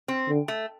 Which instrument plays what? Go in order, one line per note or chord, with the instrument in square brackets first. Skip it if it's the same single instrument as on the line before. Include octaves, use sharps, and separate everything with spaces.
[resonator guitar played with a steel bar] C4
[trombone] D3
[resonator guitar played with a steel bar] A3